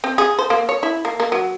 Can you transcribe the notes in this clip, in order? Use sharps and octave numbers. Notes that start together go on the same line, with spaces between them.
C4
G#4
C5
A#3
C#5
E4
A#3
A#3
F#3